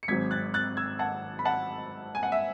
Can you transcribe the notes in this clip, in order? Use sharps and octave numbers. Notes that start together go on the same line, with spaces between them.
C#7
G#1 G#2 F#3 G#6 B6
F#6 A6
F#6 A6
E6 G#6
F#5 A5
B5
F#5 A5
G#5
F#5
E5